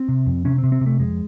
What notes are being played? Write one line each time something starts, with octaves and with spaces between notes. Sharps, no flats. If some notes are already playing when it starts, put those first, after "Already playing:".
Already playing: C4
C3
F2
C3 C#4
C4
C3
C4
C3
A3
F2 G#3